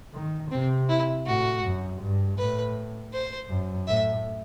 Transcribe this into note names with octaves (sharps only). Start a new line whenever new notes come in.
D#3
C3 C4
E4
A2 F#4
F#2
G2
A2 B4
C5
F#2
A2 E5